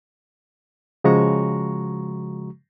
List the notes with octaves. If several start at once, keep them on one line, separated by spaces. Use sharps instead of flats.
C#3 F3 G#3 F#4 A#5 C#6